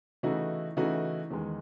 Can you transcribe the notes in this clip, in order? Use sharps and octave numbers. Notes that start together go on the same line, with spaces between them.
C#3 E3 A3 D#4 F#4
C#3 E3 A3 D#4 F#4
E2 D#3 G#3